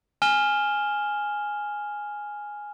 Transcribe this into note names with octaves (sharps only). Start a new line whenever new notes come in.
G#5 F6 E7 G7